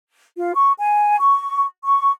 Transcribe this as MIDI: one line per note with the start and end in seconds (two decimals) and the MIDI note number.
0.36 0.52 65
0.55 0.73 85
0.78 1.16 80
1.19 1.64 85
1.84 2.11 85